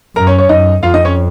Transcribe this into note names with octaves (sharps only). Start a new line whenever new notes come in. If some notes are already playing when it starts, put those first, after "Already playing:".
F#2 A#4 A#5
C#4 C#5
C#4 C#5
F#2 D#4 D#5
F2 F4 F5
D#4 D#5
C#4 C#5